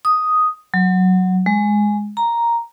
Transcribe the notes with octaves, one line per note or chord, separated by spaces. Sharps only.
D#6
F#3
G#3
A#5